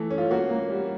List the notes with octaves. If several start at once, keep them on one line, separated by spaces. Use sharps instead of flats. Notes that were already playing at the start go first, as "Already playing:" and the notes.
Already playing: E3 A3
C#4
F4
A#3 F#4
A#3
G3